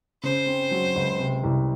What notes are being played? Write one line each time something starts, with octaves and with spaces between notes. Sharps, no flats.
C#3 C5
C4
F#3
C#2
C3
C2